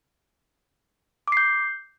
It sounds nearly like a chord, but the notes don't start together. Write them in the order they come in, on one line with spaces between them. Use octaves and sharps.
D6 C7 G6